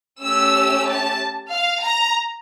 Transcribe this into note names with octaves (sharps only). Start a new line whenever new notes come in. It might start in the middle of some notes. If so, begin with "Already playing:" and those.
A3 C#4 G4 E6
A5
F5
A#5